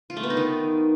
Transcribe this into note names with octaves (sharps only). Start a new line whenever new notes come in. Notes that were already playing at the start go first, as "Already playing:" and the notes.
F4
A3
B3
D#4
D#3